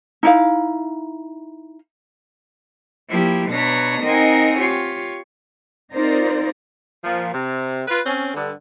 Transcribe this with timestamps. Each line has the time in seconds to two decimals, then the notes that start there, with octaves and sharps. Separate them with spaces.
0.23 D#4 E4 F5
3.10 F3 A#3 E4 G4
3.49 B2 D4 B4 C#5 A#5 A#6
4.02 C4 D#4 A#4 D#5 F#5 G#5
4.59 F4 G4 C#5
5.94 C4 D#4 F4 A#4 C5 D5
7.04 A#2 F3
7.32 C3
7.88 F4 B4
8.06 C4 C#4
8.34 G2 D3